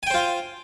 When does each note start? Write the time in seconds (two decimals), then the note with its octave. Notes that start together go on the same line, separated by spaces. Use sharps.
0.03 G#5
0.07 G5
0.10 C5
0.14 F4